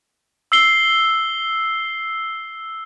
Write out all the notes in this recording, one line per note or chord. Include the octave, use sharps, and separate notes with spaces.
E6 C7 G7